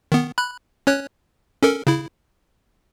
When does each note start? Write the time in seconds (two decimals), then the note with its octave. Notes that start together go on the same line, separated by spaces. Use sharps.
0.12 D#3 B3
0.38 B5 F#6
0.87 C#4 C#5 F#6
1.63 C#4 A4 A#4
1.87 C#3 E4